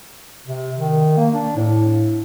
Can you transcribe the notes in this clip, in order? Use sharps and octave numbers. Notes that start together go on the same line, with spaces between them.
C3
D#3
A#3
D4
A2